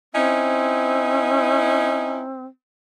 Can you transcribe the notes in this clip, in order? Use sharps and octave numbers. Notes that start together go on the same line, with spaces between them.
C4 C#4 D#4 E4